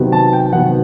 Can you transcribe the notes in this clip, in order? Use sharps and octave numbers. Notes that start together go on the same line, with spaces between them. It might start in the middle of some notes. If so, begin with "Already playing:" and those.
Already playing: C3 D#3 F#3 B3
A5
G5
C3 D#3 F#3 B3 F#5